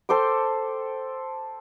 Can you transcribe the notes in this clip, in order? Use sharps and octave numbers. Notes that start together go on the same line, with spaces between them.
A4 C5 G5 D6